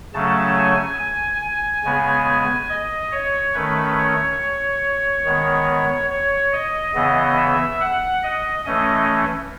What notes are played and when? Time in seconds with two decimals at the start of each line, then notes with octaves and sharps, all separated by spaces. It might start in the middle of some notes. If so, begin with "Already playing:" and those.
0.14 C#3 F#3 A3 C#4 A5
0.56 G#5
0.99 G#5
1.42 G#5
1.84 C#3 G#3 B3
2.69 D#5
3.11 C#5
3.54 D#3 A3 C#4 B4
3.97 C#5
5.25 D#3 G#3 B3
6.10 C#5
6.53 D#5
6.95 C#3 E3 B3 D#5
7.37 E5
7.80 F#5
8.23 D#5
8.65 E3 A3 C#4 D#5